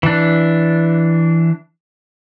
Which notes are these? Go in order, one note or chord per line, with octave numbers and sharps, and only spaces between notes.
E3 D4